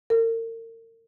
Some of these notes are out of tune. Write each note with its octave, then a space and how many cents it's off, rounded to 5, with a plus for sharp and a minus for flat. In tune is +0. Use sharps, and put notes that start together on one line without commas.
A#4 -40